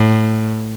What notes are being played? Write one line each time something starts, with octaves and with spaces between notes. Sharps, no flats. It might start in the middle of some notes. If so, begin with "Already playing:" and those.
Already playing: A2